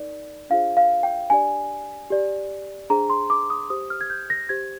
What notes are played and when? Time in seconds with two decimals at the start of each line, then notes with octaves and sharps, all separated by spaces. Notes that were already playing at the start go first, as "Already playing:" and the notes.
Already playing: D#4 A#4 D5
0.50 D4 F4 G#4 C5 F5
0.77 F5
1.03 G5
1.30 D4 G4 D5 G#5
2.10 G4 D5
2.90 D4 G#4 C5 A#5
3.10 C6
3.30 D6
3.50 D#6
3.70 G4 C5 D#6
3.90 F6
4.01 G#6
4.10 G6
4.30 A#6
4.49 G4 C5 G#6